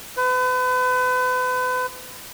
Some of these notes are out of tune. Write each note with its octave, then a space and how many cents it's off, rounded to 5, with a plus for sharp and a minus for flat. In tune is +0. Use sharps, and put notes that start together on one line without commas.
B4 +35